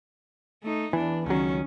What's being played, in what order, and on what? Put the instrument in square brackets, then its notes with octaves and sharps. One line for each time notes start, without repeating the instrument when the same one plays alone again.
[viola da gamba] A3 D#4
[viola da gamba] E2 D4 [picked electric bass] E3
[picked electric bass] C#2 F#3 [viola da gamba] D#3 C#4